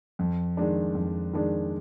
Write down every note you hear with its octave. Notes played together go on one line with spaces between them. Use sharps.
F2
D#3 G#3 D4
F2
D#3 G#3 D4